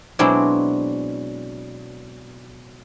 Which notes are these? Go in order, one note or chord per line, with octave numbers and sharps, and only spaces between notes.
B2 F#3 G#3 C4 D4 E4